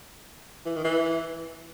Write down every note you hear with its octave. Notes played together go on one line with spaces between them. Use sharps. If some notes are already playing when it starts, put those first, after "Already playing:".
E3
D#3
E3